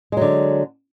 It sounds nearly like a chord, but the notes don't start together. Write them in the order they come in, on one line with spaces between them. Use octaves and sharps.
G#3 F#3 D3